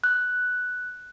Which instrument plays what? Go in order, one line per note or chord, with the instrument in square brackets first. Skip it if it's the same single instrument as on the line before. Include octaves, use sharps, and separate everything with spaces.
[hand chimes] F#6